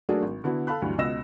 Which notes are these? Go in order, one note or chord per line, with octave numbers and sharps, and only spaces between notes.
F#3 A3 A#3 D4 F#4 G#4
G#1
D3 B3 E4 F#4
A4 F5 A5 B5 F#6
D2 G2 E3 F#3
C#2 B2 D#5 E6 A#6 E7